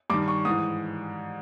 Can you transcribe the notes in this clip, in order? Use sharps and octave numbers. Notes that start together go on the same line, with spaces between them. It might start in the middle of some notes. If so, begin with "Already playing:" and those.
G2 D#3 D6
C#6
G#2 E3 D#6